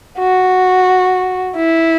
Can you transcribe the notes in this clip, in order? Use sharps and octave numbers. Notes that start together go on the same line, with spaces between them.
F#4
E4